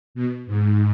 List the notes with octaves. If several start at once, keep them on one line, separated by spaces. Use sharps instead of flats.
B2
G#2